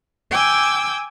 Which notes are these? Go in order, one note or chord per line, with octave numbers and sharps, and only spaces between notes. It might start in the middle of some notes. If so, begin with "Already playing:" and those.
G5 G#5 D6 E6 G#6